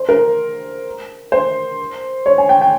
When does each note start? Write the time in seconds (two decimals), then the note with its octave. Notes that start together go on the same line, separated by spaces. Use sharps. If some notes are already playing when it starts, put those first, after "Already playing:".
Already playing: C5
0.09 A#4
1.32 C5
2.26 C#5
2.38 G#5
2.49 G5
2.61 G5